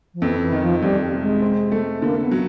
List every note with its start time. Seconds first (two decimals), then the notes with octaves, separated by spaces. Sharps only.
0.14 F3
0.22 F2 E3
0.41 E3
0.52 D#3
0.62 F3
0.82 F2 G3
1.11 C3
1.21 G#3
1.42 C4
1.72 A3
2.02 D3 A#3
2.21 B3
2.31 F#3